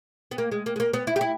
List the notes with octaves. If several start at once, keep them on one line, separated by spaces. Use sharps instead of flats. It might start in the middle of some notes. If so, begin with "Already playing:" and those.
B3
A#3
G#3
A#3
G#3
A#3
B3
E4
G4
E4